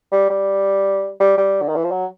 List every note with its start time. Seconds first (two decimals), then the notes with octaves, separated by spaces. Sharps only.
0.12 G3
0.30 G3
1.20 G3
1.38 G3
1.62 D3
1.69 D#3
1.76 E3
1.84 F3
1.91 F#3